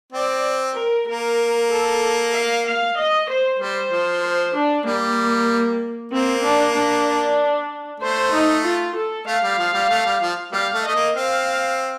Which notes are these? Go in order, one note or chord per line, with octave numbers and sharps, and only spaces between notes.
C4 D5
A#4
A#3 A#4
A4
F5
F5
D#5
C5
G3 C5
F3
C5
D4
G3 A#3
A#3 C4
D4
D4
A3 C5
D#4
F4
A4
A3 F5
G3
F3
G3
A3
G3
F3
G3 F5
A3
A3 D#5
A#3
C4 F5